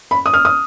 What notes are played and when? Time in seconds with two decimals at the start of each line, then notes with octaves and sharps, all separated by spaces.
0.11 B5
0.26 D#6
0.33 F6
0.45 D#6